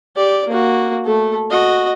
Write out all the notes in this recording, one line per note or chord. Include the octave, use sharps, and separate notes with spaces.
G4 D5
A#3 F#4
A3 A4
F#4 D#5